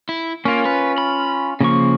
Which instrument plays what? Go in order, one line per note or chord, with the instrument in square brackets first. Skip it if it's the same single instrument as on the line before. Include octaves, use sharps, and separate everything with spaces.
[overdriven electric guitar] E4
[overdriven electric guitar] A#3 [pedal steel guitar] C#4 F4
[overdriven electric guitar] B4
B5
[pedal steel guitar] C#3 F3 C#6 [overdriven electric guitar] A#3